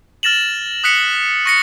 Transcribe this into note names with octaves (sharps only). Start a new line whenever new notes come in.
F6 A6 A#6 E7 F#7
D#6 F#6 B6 C#7
C#6 A#6 C#7